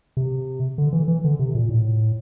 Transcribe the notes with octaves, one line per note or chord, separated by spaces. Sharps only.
C3
D3
E3
E3
D3
C3
A#2
A2